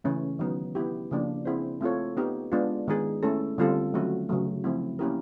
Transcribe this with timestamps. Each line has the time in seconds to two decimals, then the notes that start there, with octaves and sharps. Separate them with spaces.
0.04 C#3 E3 A3 C#4
0.39 D#3 F#3 B3 D#4
0.75 B3 E4 G4
1.11 C#3 F3 A#3 D4
1.45 C4 E4 G#4 C5
1.81 A3 C4 F4 A4 C#5
2.17 B3 D#4 G4
2.52 G#3 B3 D4 F4
2.88 D#3 G#3 B3 D#4 G#4
3.23 A3 C#4 E4 A4
3.58 D3 G3 C4 F4 A4
3.93 D#3 F#3 A3 C#4 F#4
4.29 C#3 F#3 A3
4.64 F3 A3 C4 E4
4.99 A#3 C#4 E4 G4 A#4